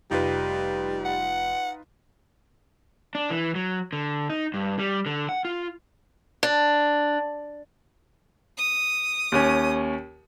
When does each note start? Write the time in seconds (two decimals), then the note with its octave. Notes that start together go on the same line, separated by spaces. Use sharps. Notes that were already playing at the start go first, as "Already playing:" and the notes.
0.11 F1 G3 D#4 F4 B4
1.05 F#5
3.15 D4
3.30 E3
3.55 F#3
3.93 D3
4.30 D#4
4.54 G2
4.79 G3
5.06 D3
5.29 F#5
5.45 F4
6.43 D4
8.58 D#6
9.32 D#2 C#4